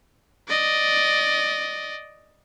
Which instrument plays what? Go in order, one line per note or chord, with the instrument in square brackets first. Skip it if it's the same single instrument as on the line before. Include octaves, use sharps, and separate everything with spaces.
[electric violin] D5 D#5